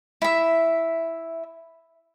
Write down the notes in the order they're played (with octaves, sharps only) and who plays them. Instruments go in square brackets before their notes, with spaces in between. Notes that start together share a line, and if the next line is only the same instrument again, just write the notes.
[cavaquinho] E4 E5